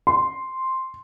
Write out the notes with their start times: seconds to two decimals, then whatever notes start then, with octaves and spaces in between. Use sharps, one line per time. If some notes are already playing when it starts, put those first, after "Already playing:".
0.07 C6